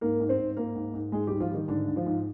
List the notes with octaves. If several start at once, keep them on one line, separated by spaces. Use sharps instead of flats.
G#2 A#3 A#4
G#2
C4 C5
G#2
G#2 A#3 A#4
G#2
G#2
G#2 G#3 G#4
G#2 G3 G4
F3 F4
D#3 G3 D#4
G#2 D3 D4
G#2
F3 F4
G#2